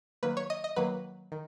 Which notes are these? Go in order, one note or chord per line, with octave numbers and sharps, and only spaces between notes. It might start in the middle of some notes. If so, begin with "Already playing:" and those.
D#3 F#3 A#3 B4
C#5
D#5
D#5
D#3 F#3 A#3 B4
D#3